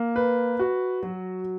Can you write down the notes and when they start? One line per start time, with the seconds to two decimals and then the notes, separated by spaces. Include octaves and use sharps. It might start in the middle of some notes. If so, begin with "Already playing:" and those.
Already playing: A#3
0.16 B4
0.59 F#4
1.03 F#3